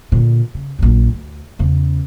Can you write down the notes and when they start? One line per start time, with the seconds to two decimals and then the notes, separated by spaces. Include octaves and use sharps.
0.12 A#2 D3
0.55 C#3
0.79 A#1 F#2
1.11 D2
1.59 E2 C#3